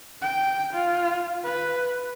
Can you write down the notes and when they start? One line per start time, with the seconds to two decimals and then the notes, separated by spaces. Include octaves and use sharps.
0.22 G5
0.74 F4
1.44 B4